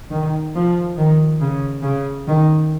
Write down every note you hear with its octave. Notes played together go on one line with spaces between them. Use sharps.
D#3
F3
D#3
C#3
C#3
D#3